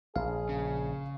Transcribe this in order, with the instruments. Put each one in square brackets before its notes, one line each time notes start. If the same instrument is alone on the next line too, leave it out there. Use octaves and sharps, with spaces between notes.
[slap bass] A#1 [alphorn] G#4 [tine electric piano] F5
[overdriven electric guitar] C#3